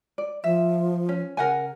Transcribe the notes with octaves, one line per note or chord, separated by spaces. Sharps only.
D5
F3 E5
C#4
C#3 A#4 F#5 G#5